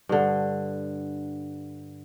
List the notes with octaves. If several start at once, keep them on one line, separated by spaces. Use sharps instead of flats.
G2 D3